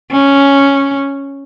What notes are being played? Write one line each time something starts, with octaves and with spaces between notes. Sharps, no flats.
C#4